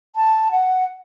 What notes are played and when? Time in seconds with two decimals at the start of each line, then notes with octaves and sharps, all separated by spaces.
0.16 A5
0.51 F#5